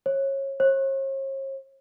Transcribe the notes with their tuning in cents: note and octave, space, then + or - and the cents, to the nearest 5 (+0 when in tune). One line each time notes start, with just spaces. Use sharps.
C#5 -25
C#5 -45